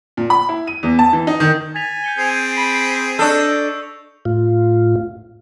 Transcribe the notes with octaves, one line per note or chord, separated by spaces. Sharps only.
A#2
B5
E4
D#7
E2
A5
E3
D#4
D#3
G#5 A6 B6 F7
G6 C#7 G7
C4 G#4 C7 D#7 F7
B5
D4 A4 D#5 C#6 E6 G6
A2 F4